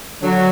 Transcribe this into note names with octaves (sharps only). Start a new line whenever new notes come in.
D3 F#3